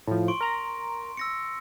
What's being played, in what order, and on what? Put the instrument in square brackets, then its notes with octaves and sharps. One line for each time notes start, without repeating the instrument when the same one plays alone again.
[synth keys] A2 F3
[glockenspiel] C6 C#6 D7
[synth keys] A#4 A#5
[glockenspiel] E6 A#6 C#7